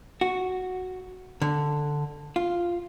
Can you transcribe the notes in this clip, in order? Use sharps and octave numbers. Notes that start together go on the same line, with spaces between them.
F#4
D3
F4